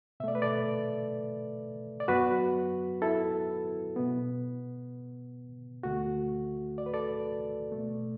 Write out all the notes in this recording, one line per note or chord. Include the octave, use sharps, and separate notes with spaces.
B2 A3 D5 E5
B4
A4 D5
D5
F#2 F#3 B3 F#4 B4
E4 A4
B2 B3
D2 D3 A3 F#4
D5
B4
A4 D5
B2 A3